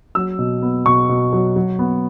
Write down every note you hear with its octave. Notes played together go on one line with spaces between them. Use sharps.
F#3 E6
B2
B3
B2 C#6
B2
F#3
F#3
B3